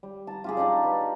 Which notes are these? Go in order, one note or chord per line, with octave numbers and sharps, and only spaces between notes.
G3
A5 A#5
F4 G4 G#4
D4 D#4 G4 D5
B4